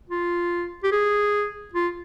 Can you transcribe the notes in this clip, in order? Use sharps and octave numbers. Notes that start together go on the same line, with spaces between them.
F4
G4
G#4
F4